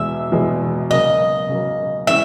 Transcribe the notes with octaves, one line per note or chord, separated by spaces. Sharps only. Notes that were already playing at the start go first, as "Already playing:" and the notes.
Already playing: E2 B2 G#3 E5
E2 B2 G#3
C#3 F#3 A#3 D#5
C#3 F#3 A#3
E3 G#3 C#4 E5